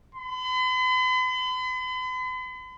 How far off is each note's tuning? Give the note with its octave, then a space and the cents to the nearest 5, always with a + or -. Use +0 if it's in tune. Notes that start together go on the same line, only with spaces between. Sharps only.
B5 +45